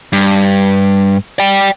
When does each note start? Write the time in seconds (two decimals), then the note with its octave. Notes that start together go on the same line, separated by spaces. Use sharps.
0.13 G2
1.39 D5 G5